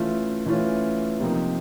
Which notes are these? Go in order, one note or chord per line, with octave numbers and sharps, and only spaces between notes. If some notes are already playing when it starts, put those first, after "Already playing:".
Already playing: E3 A3 C#4 F4
E3 A3 C#4 F4
C3 F3 A#3 D#4